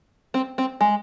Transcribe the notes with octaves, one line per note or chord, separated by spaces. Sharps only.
C4
C4
G#3